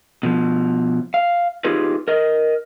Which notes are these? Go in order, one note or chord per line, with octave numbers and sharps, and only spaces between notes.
B2 F3
F5
D#4 F4 G4 G#4 B4
A#4 D#5